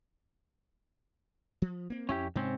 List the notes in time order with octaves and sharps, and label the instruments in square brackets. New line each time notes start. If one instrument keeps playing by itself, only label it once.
[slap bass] F3
A#3 C4
[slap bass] F2 [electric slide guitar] C#4 E4 G4
[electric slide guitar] G#2 C4 C#4 [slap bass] C3